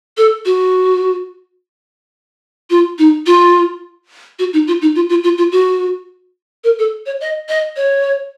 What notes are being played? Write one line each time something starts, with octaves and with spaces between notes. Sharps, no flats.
A4
F#4
F4
D#4
F4
F#4
D#4
F4
D#4
F4
F4
F4
F4
F#4
A#4
A4
C#5
D#5
D#5
C#5